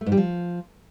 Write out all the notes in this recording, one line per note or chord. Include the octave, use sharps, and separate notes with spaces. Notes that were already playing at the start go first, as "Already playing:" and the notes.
A3
G#2
G3
F3